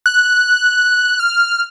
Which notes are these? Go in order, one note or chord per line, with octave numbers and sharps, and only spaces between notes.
F#6
F6